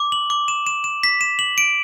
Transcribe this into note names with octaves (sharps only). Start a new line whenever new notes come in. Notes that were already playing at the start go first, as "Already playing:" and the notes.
Already playing: D6
F#7
D6
E7
E7
E7
B6
E7
F#7
D7